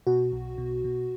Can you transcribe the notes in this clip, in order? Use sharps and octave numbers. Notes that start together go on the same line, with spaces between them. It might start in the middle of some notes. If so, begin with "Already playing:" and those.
B2 F#4
B1
B2
B2